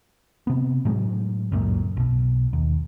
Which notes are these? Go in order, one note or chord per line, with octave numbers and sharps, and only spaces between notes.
C3 B3
A2 F#3 G#3
C#2 F#2 A#2
B1 B2
D#2